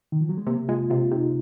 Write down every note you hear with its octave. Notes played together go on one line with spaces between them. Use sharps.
D#3
F3
F#3
G#3
C3 A#3
G#3 F4
C3 F4
C3 D#4